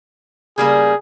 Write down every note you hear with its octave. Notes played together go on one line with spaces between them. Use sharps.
C#3 G3 A#3 G#4